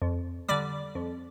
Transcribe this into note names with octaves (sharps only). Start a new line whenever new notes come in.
F2
D3 G3 D5 D6
F2